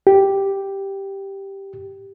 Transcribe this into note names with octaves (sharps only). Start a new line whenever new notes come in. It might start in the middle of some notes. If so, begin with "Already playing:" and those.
G4